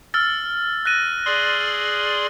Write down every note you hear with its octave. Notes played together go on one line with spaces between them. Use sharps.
E6 F6 A6
F#6 A#6 D#7
G#4 D5 C6